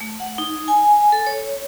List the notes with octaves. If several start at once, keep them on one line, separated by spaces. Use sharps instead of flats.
A3
F#5
D#4
G#5
A4
C#5